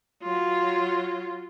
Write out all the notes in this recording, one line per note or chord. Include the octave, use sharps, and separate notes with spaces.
F#3 F4